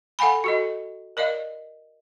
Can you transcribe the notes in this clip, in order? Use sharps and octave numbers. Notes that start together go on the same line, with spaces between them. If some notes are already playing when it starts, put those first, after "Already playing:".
A4 F5 F#5 G#5 B5
F#4 A4 D#5
A#4 D5 D#5 F5